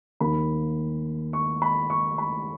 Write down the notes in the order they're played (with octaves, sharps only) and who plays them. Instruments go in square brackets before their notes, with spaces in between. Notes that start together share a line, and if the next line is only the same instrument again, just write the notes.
[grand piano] D#2 D#3 A#3 B5
C#6
B5
C#6
B5